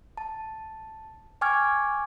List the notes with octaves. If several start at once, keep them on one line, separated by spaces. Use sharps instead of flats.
A5
G5 G#5 C#6 D6 F6 G#6